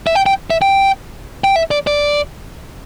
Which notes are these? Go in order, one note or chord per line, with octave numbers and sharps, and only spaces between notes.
E5
G5
G5
E5
G5
G5
E5
D5
D5